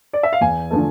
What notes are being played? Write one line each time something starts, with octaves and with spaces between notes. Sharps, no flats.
D5
E5
F5
E2 G#5
D3 F3 A3